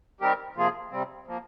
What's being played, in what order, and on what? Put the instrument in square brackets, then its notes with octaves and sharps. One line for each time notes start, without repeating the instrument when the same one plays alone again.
[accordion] D#3 G3 C4 G4 A#4
C3 F3 A#3 F4 G#4
C3 G3 C4
F3 A#3